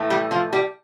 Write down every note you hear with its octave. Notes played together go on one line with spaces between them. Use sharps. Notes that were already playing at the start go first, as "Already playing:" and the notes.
Already playing: A2 E3 A3
G3 G4
F3 F4
G3 G4